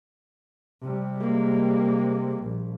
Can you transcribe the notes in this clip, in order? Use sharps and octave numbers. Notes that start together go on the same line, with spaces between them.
C3 G3
G#3 A#3
A#1